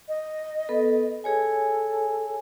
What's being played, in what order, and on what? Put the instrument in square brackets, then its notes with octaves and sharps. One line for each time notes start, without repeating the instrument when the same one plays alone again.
[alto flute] D#5
[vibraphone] B3 A4 B4
[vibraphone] G#4 C#5 G#5 [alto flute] A4